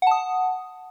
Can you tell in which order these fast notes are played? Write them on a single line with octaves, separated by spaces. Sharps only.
F#5 A5 D#6